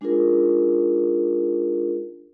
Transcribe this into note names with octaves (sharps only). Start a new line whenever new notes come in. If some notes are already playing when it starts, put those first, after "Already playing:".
G#3 D4 D#4 F4 G#4 A#4